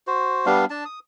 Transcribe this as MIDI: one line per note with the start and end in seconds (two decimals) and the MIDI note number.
0.07 0.46 66
0.07 0.46 72
0.46 0.65 55
0.46 0.65 59
0.46 0.65 62
0.46 0.65 77
0.70 0.84 62
0.70 0.84 81
0.85 0.99 87